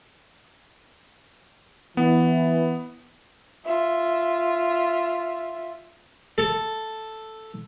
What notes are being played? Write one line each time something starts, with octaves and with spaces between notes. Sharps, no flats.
E3 B3
F4 E5
A4